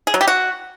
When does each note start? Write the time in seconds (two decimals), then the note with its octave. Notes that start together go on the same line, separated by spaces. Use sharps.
0.07 G#4
0.14 F#3
0.21 G4
0.27 F#4